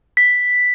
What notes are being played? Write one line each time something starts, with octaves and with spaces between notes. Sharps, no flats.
B6